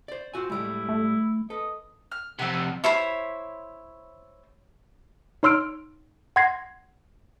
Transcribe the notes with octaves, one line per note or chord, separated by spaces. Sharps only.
C5 D5
C4 F4 F#4 G#5
A2 G3 G#3 E4
A3
A4 B4 D#5
F6
F2 C3 C4 F#5
E4 C5 C#5 B5
D#4 C#5 C6 E6 F6 D7
F#5 C6 G#6 A#6 C7